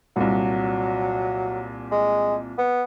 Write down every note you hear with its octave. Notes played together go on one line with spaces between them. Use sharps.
C2 A#2 F#3
G#3
B3